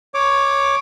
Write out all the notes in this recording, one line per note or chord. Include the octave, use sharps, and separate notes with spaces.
C#5 D6